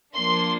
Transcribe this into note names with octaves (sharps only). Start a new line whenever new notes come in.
F3 A#3 D4 C6